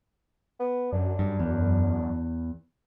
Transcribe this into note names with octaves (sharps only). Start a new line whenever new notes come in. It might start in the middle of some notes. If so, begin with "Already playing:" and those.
B3
F#2 D4
G2
E2